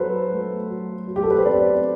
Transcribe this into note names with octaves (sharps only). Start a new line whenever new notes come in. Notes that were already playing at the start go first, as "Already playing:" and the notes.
Already playing: F#3 A4 B4 C5
A3
F#3
F#3
G4
A4
B4
C5
C4 D5